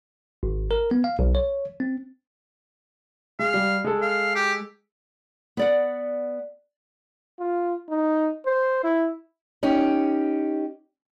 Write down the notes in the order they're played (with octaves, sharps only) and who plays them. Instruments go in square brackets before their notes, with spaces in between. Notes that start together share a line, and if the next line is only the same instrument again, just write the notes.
[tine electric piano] G#1
A#4
B3
F5
B1
C#5
C4
[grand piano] G#3 [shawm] F5
[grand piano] G3
G#3 A4
[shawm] F5
G4
[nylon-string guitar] B3 D5 F#5
[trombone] F4
D#4
C5
E4
[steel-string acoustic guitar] C#4 D#4 G4